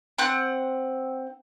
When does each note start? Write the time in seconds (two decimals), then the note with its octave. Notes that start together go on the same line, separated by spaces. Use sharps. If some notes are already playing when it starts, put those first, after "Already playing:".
0.18 C4 F#5 F#6